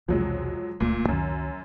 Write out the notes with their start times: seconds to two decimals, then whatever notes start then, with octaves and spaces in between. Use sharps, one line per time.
0.08 B1 E2 C3 F3 F#3 G#3
0.80 D1 C#2 A#2 A3
1.08 C#2 F#2 D#3